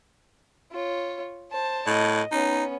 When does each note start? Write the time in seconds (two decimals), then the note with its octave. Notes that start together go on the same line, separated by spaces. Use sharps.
0.72 F4 C#5
1.51 C5 A5
1.87 A2 D#5
2.32 B3 C#4 D#4